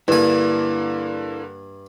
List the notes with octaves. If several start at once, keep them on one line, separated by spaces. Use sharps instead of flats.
G2 D3 A#3 E4 D5 G#5